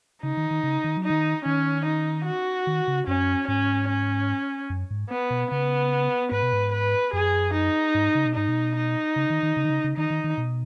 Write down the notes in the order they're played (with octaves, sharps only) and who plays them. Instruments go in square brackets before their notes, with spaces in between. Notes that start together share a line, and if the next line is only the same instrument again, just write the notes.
[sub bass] C#3 [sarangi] D#4
[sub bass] D#3
D#3
C#3
D#3
F#3
[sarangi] D#4
[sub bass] D#3
[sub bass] D#3 [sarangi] C#4
[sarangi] D#4
F#4
[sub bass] D#3
C#3
[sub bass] F#2 [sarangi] C#4
[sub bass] G#2 [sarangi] C#4
[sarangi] C#4
[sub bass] F#2
G#2
[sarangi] B3
[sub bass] B2
[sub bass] C#3 [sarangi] B3
[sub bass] G#2 [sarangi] B4
[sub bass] B2
G#2
[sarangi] B4
[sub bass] F#2 [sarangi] G#4
[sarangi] D#4
[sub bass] G#2
C#3
B2
[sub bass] G#2 [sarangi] D#4
[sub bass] B2
[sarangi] D#4
[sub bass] C#3
D#3
D#3
C#3
D#3
C#3
C#3
[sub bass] D#3 [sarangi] D#4
[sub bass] D#3
D#3
B2